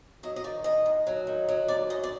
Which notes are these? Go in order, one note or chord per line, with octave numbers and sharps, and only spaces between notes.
F#3 D#5
D#5
D#3 D5
D#2 D#5
D#2
F#3
D#3
F#3
D#2 D5
F#2 D#5
D5